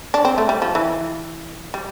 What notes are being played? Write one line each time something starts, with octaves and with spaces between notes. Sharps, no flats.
D4
C4
A3
G3
F3
E3
G3